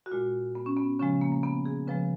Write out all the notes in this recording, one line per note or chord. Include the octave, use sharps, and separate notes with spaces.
F#4
A#2 G#3 F4
B3
C#4
B3
C#3 F3 G#3 C#4
A#3
A#3
B3
G#4
C#3 F3 G#3 B4